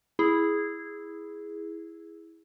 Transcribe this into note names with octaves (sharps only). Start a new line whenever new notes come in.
E4 G#4